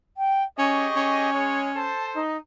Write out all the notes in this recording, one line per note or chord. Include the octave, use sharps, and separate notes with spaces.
G5
C#4 G4 G#4 D#5 C#6
C#4
G#3 G#4 C#5
A4 C5 A5
D#4